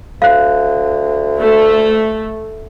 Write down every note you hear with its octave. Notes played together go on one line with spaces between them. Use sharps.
D2 F5 F#6
A3